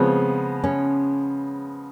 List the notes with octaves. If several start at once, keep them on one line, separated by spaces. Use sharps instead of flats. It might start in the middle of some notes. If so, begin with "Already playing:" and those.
Already playing: C#3 F3 G#3 B3 C4
C#4